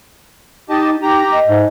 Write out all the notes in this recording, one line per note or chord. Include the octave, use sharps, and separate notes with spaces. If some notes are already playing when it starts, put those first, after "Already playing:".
D#4 G4 D#5 A5
D#4 G4 A#5
D#5
G#2 A3